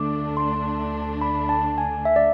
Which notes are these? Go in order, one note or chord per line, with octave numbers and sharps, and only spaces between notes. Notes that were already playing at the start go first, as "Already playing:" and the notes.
Already playing: D2 D3 A3 D4 D6
C6
B5
A5
G#5
E5
D5